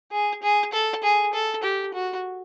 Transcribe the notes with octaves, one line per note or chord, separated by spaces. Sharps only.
G#4
G#4
A4
G#4
A4
G4
F#4